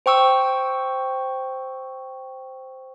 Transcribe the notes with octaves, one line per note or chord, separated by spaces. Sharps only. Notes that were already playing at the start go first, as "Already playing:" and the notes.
C5 G5 C#6 E6